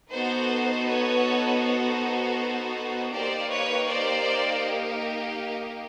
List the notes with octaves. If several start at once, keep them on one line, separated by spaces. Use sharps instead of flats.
B3 D#4 F#4 A4 C5
B4 C#5
C5
A#3 D#4 G4 C5 D5
B4 C#5
C5 D5